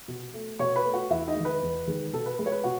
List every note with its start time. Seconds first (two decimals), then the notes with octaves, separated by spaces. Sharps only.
0.08 B2
0.34 A3
0.59 B2 C#5 C#6
0.76 B4 B5
0.85 A3
0.94 F#4 F#5
1.10 E2 E4 E5
1.28 D#4 D#5
1.36 D#3 G#3
1.45 B4
1.62 E2
1.87 D#3 G#3
2.13 B2 A4
2.26 B4
2.38 G#3 B4
2.46 C#5
2.52 B4
2.64 B2 F#4 F#5